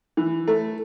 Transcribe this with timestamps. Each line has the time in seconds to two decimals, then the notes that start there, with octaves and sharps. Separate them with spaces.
0.17 E3
0.48 A3